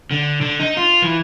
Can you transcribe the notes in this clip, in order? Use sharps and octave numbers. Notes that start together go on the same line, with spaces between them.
D3
D3
D#4
F4
E3